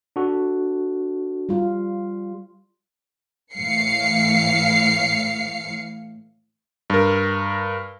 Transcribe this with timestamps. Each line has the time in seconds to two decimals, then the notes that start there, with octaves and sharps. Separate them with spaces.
0.16 D4 F#4 A4
1.49 G3 F4
3.54 A2 E3 F5 C7 C#7
6.90 G2 A#4